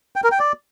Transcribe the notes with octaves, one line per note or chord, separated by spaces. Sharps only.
G5
A#4
G5
D5